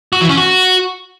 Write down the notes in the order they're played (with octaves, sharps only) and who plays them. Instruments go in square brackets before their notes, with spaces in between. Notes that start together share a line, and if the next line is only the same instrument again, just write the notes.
[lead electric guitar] F#4
E3
C#4
F#4